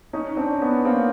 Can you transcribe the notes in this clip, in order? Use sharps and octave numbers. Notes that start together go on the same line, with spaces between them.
C#4 D#4
C4 D4
B3 C#4
A#3 C4